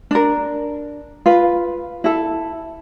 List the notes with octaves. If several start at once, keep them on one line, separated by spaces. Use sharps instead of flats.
D4 A#4
F4 B4
E4 A4